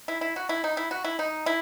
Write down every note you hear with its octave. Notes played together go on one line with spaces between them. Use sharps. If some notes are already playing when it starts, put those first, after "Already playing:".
E4
E4
F#4
E4
D#4
E4
F#4
E4
D#4
E4